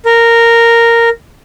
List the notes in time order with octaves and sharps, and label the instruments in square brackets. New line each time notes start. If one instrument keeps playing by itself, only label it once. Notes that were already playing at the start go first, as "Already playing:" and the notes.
[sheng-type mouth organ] A#4